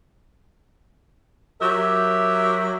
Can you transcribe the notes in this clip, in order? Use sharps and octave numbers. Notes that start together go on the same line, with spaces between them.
F#3 G4 A#4 E5